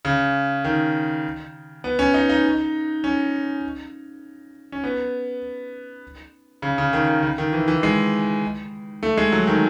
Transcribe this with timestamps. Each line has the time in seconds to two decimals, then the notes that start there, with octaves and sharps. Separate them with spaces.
0.05 C#3
0.64 D#3
1.84 B3
1.99 C#4
2.14 D#4
2.29 D#4
3.04 C#4
4.72 C#4
4.84 B3
6.62 C#3
6.78 C#3
6.93 D#3
7.08 D#3
7.23 C#3
7.38 D#3
7.53 E3
7.68 E3
7.83 G#3
9.03 A3
9.18 G#3
9.32 F#3
9.47 D#3